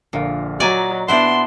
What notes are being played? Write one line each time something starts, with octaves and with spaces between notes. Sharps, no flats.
A#1 A#2 D3 F5
F#3 D5 D#5 G#5 A#5
B3 D4 E4 C5 F#5 C6